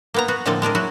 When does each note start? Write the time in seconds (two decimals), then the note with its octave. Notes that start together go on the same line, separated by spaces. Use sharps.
0.14 A#3 B3 A#5
0.28 B3 F#4
0.46 A2 D3 F3 A#3 C4 A4
0.62 G#3 D4 G#4 A#4
0.75 F#3 E4 F#4